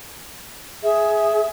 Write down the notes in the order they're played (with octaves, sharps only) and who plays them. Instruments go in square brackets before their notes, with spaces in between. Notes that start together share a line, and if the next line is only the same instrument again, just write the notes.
[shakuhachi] G#4 [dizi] E5